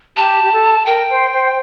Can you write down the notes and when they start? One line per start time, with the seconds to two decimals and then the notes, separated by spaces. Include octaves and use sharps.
0.17 G4 A5
0.43 G4
0.52 A4
0.86 A#4 G5
1.09 C5
1.32 C5